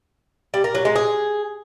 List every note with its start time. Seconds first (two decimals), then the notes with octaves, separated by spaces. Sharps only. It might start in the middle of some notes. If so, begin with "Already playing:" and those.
0.54 G3
0.64 A#4
0.75 F#3
0.85 G#3
0.96 G#4